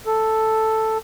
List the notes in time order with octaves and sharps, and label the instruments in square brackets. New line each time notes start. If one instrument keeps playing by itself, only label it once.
[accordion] A4